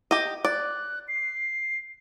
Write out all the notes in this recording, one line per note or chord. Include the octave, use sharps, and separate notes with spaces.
G4 D#5
D5 F#6
C7